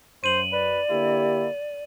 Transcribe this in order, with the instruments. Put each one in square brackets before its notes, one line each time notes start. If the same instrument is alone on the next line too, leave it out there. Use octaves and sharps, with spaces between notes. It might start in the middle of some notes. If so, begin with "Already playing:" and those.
[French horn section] F#2 [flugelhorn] C5 [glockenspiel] D#7 F#7
[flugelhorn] B4 [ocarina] D5
[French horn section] D3 A#3 G4 [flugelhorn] E4